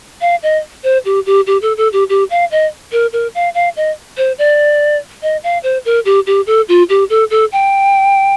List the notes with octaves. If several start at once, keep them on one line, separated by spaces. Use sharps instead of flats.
F5
D#5
C5
G4
G4
G4
A4
A4
G4
G4
F5
D#5
A#4
A#4
F5
F5
D#5
C5
D5
D#5
F5
C5
A#4
G4
G4
A4
F4
G4
A4
A4
G5